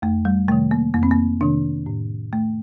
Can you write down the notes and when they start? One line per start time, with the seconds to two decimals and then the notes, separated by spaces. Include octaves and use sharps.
0.02 F2 A3
0.25 G3
0.48 C3 D#3 A3
0.71 A#3
0.94 F2 A#3
1.03 C4
1.11 A#3
1.41 C3 D#3 D4
1.86 A2
2.33 A3